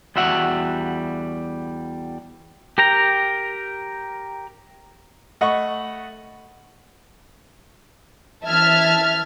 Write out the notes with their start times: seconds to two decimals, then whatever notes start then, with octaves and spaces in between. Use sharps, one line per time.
0.16 E2 G3 F#4 E5 F#5
2.78 G4 A#4 G5 A#5
5.41 A3 D#5 F#5 B5 C#6
8.44 E3 E5 A5 F6 G#6